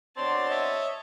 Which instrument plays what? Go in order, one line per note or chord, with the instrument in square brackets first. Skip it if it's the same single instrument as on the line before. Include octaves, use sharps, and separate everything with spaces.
[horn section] B2 C4 D4 [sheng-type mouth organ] C#5 C6 [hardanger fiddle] A5
[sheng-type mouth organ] C#5 D#5 E5